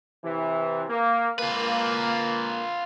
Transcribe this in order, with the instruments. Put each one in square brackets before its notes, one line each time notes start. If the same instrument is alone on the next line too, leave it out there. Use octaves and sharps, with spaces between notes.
[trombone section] C3 E3
A#3
[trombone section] A#3 [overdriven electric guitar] F4 B4